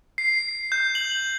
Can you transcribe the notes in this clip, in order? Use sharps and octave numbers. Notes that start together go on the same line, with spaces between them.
C7
G6
F#7